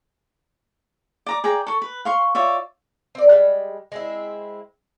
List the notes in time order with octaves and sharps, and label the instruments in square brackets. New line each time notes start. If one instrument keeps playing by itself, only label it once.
[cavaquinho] D5 A#5 D6
G#4 D5 G5 A#5
A4 C#6
B4
F5 C6 C#6
F4 C#5 D5 E5
[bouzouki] C4 D5
G3 G#3 F#5 G5
G#3 C4 E4